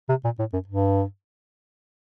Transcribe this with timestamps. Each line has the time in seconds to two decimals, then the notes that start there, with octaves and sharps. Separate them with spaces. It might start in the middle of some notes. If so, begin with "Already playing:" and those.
0.09 C3
0.24 A#2
0.39 A2
0.53 F#2
0.68 G2